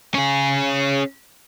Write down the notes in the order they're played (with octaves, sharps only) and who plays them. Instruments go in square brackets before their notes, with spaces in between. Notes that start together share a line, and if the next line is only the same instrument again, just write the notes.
[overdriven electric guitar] C#4 G#4